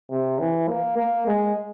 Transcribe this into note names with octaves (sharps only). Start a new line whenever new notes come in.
C3
E3
A#3
A#3
G#3